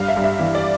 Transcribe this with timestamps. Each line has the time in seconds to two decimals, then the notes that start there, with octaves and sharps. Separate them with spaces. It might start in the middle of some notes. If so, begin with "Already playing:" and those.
Already playing: G2 F5
0.08 E5
0.16 G2
0.24 E5
0.39 E3
0.55 D5